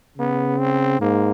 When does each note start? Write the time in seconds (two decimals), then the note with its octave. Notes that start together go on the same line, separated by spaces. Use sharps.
0.18 C#3 B3
0.59 C4
1.00 G#2 A#3